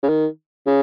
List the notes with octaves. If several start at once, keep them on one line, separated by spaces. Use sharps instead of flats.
C#3
D#3
C#3